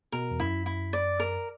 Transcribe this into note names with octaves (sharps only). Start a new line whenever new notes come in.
B2 A#4
E2
F#2 E4
E4
D5
A#4